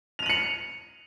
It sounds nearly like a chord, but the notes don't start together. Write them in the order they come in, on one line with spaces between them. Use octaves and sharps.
F7 D#7 F#7 C#7